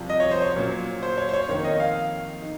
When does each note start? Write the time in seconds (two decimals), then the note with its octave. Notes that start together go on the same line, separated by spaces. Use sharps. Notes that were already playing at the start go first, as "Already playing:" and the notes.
Already playing: C2 C3 F3
0.10 D#5
0.20 C#5
0.31 C5
0.42 C#5
0.56 A#2 F#3 C#4
1.03 C5
1.17 C#5
1.29 C5
1.33 C#5
1.49 F2 D#3 A#3 D#4 C#5
1.64 D#5
1.80 F5
2.42 D#4